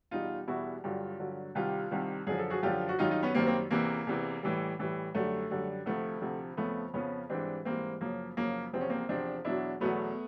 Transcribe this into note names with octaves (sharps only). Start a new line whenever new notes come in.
E2 B2 G3 D#4 F4
E2 B2 G3 E4 F#4
G2 D3 F#3 F4 G4
G2 D3 F#3
C2 C3 D#3 G3 F4 G4
C2 C3 D#3 G3
F#2 D3 F3 G#4
A4
F#4 G#4
F#2 D3 F3 F4 G4
F#4
F#2 D#3 G3 D#4 F4
D#4 F4
B3 C#4
F#2 D#3 G3 A#3 C4
A#3 C4
E2 C3 E3 A#3
E2 C3 E3
A2 E3 G3
A2 E3 G3
F#2 D3 G3 A3
F#2 D3 G3
D2 C3 F3 A3
D2 C3 F3
F2 C#3 F3 A3 B3
F2 C#3 F3 B3 C#4
G#2 E3 G3 C4 D4
G#2 E3 G3 A#3 C4
F#2 C#3 F3 A#3
F#2 C#3 F3 A#3
E2 C3 F3 C4
C#4
A#3 C4
E2 C3 F3 C4 D4
E2 B2 F#3 D4 E4
E2 B2 F#3 A3 B3